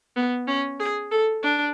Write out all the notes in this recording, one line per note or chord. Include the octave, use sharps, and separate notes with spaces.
B3
C#4
G#4
A4
D4